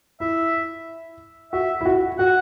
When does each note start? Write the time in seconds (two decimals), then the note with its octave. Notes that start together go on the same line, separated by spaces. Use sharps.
0.20 E4 E5
1.52 F#4 E5
1.81 E4
1.85 F#4
2.19 F#4 F#5